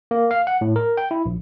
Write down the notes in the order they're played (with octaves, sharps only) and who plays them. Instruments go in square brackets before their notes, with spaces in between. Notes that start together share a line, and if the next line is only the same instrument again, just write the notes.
[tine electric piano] A#3
F5
F#5
A2
A#4
G5
E4
A#1